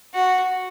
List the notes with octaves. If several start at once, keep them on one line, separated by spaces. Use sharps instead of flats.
F#4